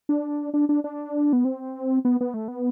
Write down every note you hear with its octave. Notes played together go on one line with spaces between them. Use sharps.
D4
D4
D4
D4
B3
C4
B3
B3
A3
B3